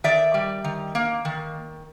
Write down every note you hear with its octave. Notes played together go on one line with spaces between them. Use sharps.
D#3 D5 E5
G3
D#3
A#3
D#3